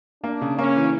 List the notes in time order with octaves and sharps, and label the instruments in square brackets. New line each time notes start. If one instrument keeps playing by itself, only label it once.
[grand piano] A#3 [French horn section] D4
[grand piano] C#3
[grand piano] A#3 [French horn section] C#4
[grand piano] E3